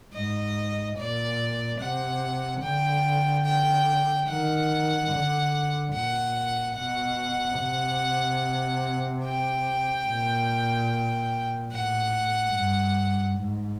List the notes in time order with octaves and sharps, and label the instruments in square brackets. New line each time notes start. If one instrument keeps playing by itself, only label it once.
[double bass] G#2 [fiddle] D#5
[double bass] A#2 [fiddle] D5
[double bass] C3 [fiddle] F#5
[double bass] D3 [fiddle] G5
[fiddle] G5
[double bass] D#3 [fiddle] F#5
[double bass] D3
[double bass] A#2 [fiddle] F#5
[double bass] B2 [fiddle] F#5
[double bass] C3
[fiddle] G5
[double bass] A#2
[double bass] A2 [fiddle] F#5
[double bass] G2
G#2